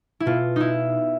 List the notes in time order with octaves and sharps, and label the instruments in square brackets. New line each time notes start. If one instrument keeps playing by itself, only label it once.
[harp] E4
B2 F4
D#4 E4